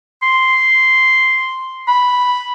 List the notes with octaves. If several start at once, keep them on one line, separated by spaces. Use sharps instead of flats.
C6
B5